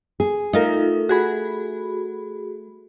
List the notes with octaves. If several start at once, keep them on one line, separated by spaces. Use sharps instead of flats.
G#4
A3 D#4 F4 A#4
F#4 G#4 B5